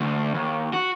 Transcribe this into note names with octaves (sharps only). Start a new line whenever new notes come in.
D2
D#2
F#4